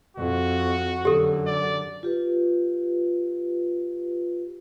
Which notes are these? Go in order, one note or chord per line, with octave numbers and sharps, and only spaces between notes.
F2 F#4
F#2 D3 G4 A4
D5
F4 G4 B4